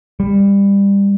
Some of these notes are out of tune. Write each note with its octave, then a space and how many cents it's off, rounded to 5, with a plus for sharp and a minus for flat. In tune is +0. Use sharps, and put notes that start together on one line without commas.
G3 +25